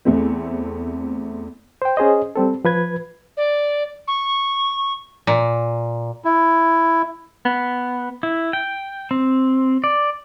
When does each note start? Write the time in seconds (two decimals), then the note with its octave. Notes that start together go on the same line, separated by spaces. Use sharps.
0.05 E2 A3 C4
1.82 C5 G5
1.97 C#4 G#4 C5 D#5
2.36 G3 C4 A4
2.65 F3 B4 G#6
3.37 D5
4.08 C#6
5.27 A#2
6.25 E4
7.45 B3
8.23 E4
8.53 G5
9.11 C4
9.84 D5